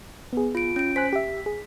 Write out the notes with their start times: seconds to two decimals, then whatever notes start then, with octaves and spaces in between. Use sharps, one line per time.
0.33 B3 G#4
0.55 F4 D7
0.76 C#4 D7
0.96 C5 G#5 F#6 B6
1.13 G4 E5
1.46 G#4